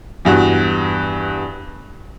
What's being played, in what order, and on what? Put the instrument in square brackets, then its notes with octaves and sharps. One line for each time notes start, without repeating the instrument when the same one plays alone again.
[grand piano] E2 G2 F#4